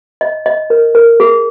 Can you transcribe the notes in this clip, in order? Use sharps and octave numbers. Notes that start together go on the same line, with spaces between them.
D#5
D#5
A#4
A#4
G#4